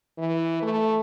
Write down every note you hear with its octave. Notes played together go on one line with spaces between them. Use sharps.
E3
A3